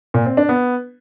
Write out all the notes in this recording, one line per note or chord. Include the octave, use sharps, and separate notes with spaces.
A#2
C4
D4
B3